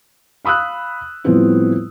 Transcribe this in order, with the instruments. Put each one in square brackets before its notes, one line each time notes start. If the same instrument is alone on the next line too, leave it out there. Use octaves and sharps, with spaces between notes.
[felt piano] F5 B5 D#6 E6 F#6
A2 F3 G3 B3 C4 E4